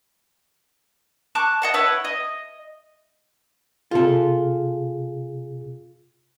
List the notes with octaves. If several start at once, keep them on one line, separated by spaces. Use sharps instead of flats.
A5 C#6 D6 F#6
D#5 F#5 A5
E4 B4 C#5 F#5
D#5
C3 F4 G#4 A4